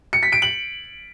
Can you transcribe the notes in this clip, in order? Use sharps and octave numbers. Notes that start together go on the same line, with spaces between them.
C#7
B6
D7
F#7